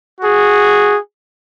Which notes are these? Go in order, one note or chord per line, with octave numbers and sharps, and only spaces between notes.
F#4 G#4